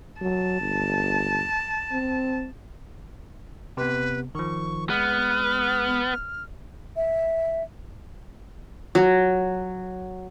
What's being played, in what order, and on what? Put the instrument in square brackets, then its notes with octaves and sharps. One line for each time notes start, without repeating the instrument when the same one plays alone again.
[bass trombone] F#3 [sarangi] A5
[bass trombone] G1
C4
[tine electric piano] C3 B3 [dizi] B4
[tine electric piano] D#3 F3 [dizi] C#6
[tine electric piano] G#3 [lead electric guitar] B3 [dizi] F6
[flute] E5
[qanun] F#3